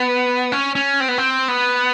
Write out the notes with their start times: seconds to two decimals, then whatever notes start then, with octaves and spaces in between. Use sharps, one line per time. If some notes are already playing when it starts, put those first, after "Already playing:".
Already playing: B3
0.52 C#4
0.75 C#4
1.00 C4
1.08 B3
1.18 C4
1.48 B3